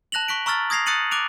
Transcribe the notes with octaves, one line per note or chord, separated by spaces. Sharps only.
A5 F#6 A#6 F7 F#7
C#6 F#6 B6 D7
A#5 C#6 E6 F6 A6
D#6 G#6 A#6 C7 F7
D#6 F#6 A6 C#7 D#7 F#7
D6 F#6 A6 D7 D#7 F7